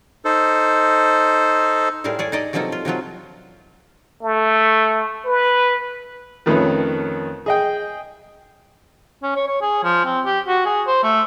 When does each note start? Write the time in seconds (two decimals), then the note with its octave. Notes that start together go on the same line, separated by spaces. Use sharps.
0.25 D#4 A4 C5
2.04 A2 G3 G#4 A#4 F5
2.19 G#4 C#5 D5
2.32 D#4 D5 D#5
2.53 C3 F3 F#3 A#3 D#4 A4
2.72 F4
2.85 C3 F3 F#3 F4
4.22 A3
5.26 B4
6.46 F2 D#3 A3 C#4 B4 C#5
7.46 G#4 D#5 G5
9.23 C#4
9.36 C#5
9.48 C#5
9.61 G#4
9.84 F3
10.05 C4
10.25 G4
10.48 F#4
10.65 G#4
10.87 C5
11.03 A3